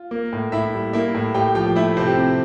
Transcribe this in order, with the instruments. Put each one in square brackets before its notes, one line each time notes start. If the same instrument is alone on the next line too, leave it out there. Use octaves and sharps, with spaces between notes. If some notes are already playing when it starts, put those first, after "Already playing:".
Already playing: [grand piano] F4
A#3
A2
A2 E4 E5
G3
A#3 E4 E5
A2
A2 G4 G5
F3 G4 G5
A3 E4 E5
C3 C4 C5
G4
C3